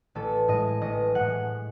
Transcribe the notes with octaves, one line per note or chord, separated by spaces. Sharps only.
A1 A4
A2 G#3 D#5
A1 D#5
A2 G#3 F#5